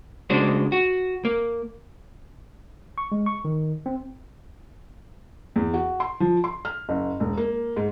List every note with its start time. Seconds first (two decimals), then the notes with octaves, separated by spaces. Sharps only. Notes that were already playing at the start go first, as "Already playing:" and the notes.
0.30 C#3 G#3 D4 F#4 C5
0.72 F#4
1.25 A#3
2.98 C#6
3.12 G#3
3.26 C#6
3.45 D#3
3.86 C4
5.56 E2
5.74 F#4
6.00 C6
6.20 F3
6.44 C6
6.65 F6
6.89 F#1
7.20 E1
7.37 A#3
7.76 G#2